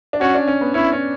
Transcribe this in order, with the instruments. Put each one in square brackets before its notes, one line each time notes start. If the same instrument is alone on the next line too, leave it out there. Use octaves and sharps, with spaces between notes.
[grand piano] D4
[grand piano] C#4 [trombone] F#4
[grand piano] D4
C#4
B3
[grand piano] C#4 [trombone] E4
[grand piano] C#4